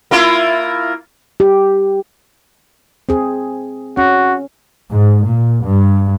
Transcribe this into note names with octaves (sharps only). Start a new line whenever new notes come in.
A#3 E4 F4
G4
C4 G#4
C#4 F#4
G#2
A#2
G2